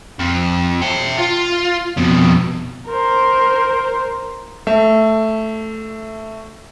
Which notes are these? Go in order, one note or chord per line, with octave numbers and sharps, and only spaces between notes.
F2
E5 G5
F4
F2 B2
A#4 C5
A3 E5